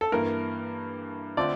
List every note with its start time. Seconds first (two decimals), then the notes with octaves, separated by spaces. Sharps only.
0.01 A4
0.12 G2 E3 A#3 A#4
1.37 D3 A3 C4 F4 D5